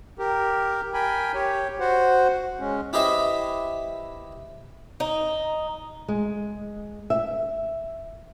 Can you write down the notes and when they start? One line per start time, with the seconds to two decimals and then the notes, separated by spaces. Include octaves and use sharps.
0.19 G4 A#4
0.94 A#4 G5 G#5 B5
1.34 G4 C#5
1.80 F#4 C5 F#5
2.60 G#3 C#4
2.93 E4 G4 B4 C5 D#5 E5
5.00 D#4
6.08 G#3
7.10 E5